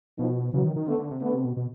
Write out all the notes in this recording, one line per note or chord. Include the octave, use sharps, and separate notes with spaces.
B2 D#3 F3
C#3 E3 F#3
D#3
D#3
D3 A3 B3
D3
C3
D3 A3 B3
C3
B2
B2